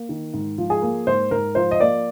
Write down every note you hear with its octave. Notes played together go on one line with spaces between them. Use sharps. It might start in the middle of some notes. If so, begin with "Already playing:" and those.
Already playing: A#3
D#3
G#2
F3
G#4
A#3
G#2 C5
G#2 A#4
F3 C5
D#5
A#3 D5